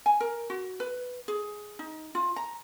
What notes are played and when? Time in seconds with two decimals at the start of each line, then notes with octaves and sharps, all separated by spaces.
0.06 G#5
0.20 A#4
0.50 F#4
0.80 B4
1.28 G#4
1.79 D#4
2.15 F4
2.36 A#5